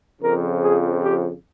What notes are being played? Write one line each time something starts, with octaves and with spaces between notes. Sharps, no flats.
F2 C#3 F3 A#4
G#4
G4